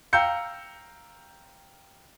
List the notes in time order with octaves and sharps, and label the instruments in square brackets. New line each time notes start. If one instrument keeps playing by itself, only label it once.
[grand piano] F5 G5 A#5 E6 G6 C#7